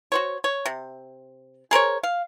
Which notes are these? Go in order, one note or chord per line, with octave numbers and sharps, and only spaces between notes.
F#4 C5 C#5
C#5
C3
G#4 A#4 C5 C#5
F5